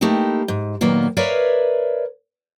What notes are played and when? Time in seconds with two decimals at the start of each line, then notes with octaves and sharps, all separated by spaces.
0.01 A3 A#3 D#4 E4 G4
0.48 G#2
0.81 A#2 D#3 F#3 A#3 B3
1.17 A#4 B4 C#5 D5 E5 F5